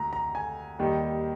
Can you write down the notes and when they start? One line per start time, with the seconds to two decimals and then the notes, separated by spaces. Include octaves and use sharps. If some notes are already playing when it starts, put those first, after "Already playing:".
Already playing: D2 A#5
0.13 A#5
0.35 G#5
0.79 D#2 D#3 G3